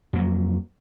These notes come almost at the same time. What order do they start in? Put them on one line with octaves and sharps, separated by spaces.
F2 A#3 F#3